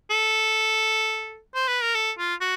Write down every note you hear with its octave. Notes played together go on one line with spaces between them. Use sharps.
A4
C5
B4
A#4
A4
F4
F#4